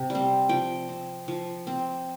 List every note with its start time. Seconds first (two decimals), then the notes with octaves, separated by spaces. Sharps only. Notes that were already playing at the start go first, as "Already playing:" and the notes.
Already playing: C3
0.10 G3 C4
0.49 F3 G5
0.89 C4
1.28 F3
1.67 C4